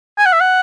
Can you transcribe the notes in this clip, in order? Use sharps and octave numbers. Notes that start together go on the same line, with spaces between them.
G#5
F#5
E5
F#5